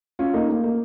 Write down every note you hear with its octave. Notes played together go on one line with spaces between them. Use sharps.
C#4 F4
A#3 D#4
A#3
A#3